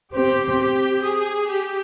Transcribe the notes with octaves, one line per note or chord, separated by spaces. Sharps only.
C4 G4
G4
G#4
G4